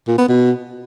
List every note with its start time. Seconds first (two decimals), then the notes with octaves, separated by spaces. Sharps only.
0.07 A#2
0.18 B3
0.29 B2